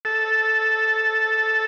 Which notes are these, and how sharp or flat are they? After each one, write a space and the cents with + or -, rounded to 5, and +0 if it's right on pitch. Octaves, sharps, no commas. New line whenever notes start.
A4 -5